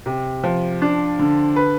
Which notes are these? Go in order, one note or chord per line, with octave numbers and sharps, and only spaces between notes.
C3
F3
D4
D3
B4